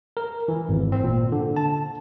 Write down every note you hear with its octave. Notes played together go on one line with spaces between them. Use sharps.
A#4
E3
G#1
C4
A#2
D3
A5